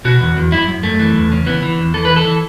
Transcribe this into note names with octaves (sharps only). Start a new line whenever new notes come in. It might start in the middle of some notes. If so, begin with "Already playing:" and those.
B2 F#4
E2
E2
F#2 E4
F#2
F#2 A3
E3
E2
C#3
E3 B3
E3
E2
E3 A4
E3 B4
A4
E3